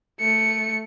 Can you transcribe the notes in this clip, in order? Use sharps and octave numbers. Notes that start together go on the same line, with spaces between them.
A3 C#7